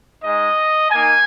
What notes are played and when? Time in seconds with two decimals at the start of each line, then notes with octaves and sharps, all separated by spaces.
0.23 G#3 D#4 D#5
0.91 A#3 D#4 G#5